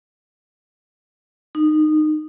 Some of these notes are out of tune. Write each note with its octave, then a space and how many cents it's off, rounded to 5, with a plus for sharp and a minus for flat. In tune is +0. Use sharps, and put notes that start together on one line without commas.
D#4 -20